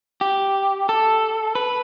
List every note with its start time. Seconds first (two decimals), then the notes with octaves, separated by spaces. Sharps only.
0.21 G4
0.89 A4
1.55 B4